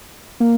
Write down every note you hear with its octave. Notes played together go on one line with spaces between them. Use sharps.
A#3